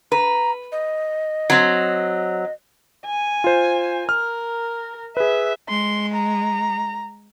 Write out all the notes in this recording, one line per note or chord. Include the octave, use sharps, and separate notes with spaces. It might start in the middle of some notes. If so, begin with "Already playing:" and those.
B4 A#5
D#5
F#3 C4
G#5
F4 C5
A#4 F6
G#4 B4 E5
G#3 C6
A#5